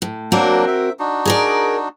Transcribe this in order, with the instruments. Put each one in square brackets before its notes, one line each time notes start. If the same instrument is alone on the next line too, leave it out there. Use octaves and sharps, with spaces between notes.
[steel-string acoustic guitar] A2
[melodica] F#3 A#3 D4 [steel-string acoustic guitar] C4 F#4 A#4
[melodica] E5
D4 D#4 F#4
[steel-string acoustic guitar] G#4 A#4 D5